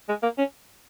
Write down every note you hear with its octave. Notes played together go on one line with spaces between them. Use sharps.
G#3
A#3
C#4